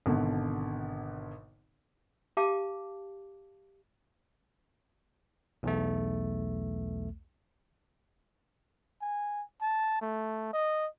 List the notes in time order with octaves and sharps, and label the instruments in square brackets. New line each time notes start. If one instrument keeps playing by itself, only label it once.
[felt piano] G#1 B2 D3
[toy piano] G4 F5 A5 D6
[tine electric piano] B1 E2 A3
[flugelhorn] G#5
A5
A3
D#5